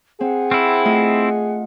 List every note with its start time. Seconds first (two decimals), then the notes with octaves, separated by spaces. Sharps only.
0.21 C4 G#4 F#5
0.51 C4 E4 C#6 F6
0.85 A3 F4 D#5